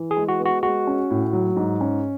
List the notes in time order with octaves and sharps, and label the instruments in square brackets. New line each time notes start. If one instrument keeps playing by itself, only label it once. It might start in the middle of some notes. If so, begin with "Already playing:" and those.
Already playing: [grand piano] E3
[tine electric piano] G#4
[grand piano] G#3
[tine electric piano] F#4
[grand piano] B3
[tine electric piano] F#4
[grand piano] G#3 [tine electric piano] F#4
[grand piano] C#4
A2
F#3
G#2
C#4